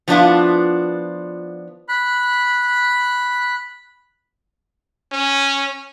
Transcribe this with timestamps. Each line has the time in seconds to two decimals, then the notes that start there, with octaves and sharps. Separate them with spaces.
0.08 F3 B3 C#4 D4 E4 F4
1.89 B5 F#6
5.12 C#4